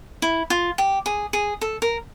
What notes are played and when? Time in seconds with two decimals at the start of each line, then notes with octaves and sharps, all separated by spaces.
0.22 E4
0.50 F4
0.78 G4
1.06 G#4
1.33 G#4
1.61 A4
1.82 A#4